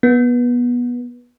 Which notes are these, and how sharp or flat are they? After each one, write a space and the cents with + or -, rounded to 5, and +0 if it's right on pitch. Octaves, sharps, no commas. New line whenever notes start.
B3 -20